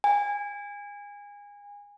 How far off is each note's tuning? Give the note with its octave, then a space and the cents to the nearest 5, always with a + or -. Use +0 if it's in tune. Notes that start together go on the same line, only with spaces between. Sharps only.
G#5 -25